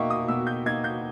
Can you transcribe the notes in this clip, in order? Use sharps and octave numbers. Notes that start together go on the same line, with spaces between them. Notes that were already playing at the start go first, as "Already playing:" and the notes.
Already playing: B2 A#3 D#4 E5 G5 C#6
D#6
B2 E6
G6
A#3 D#4 G#6
G6